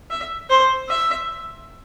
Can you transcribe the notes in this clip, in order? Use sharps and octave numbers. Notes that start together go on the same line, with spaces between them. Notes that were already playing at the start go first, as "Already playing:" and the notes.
E5
C5
E5